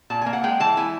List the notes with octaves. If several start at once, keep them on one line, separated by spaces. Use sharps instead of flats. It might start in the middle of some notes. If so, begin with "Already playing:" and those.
A#2 A5
A#3 G#5
F#5
G#3 G5
E3 A5
E4 G#5